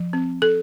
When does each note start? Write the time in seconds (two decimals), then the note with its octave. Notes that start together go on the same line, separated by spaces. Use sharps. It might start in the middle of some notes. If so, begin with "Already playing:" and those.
Already playing: F3
0.13 C4
0.42 A4